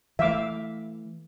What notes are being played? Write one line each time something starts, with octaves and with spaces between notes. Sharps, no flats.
E3 A3 E5 F5 D6